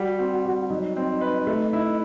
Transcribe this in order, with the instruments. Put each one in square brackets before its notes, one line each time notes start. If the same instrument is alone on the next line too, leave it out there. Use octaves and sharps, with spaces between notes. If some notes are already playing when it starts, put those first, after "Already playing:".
Already playing: [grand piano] G3 [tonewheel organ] F#4
[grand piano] C4
G3
[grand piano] F#3 [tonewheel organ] D#4
[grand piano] C4
B4
A3
E4